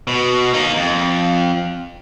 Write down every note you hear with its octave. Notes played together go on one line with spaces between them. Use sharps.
B2
A#3 D#4
F2